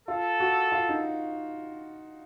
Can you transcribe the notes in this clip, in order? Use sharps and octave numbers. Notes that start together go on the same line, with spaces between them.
F4 A4
F#4
F4
D#4